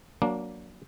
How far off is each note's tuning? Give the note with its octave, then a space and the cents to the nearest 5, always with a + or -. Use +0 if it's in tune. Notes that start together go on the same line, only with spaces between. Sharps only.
F#3 +0 A#3 +10 D4 -15